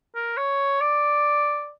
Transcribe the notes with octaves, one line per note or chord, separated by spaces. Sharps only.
A#4
C#5
D5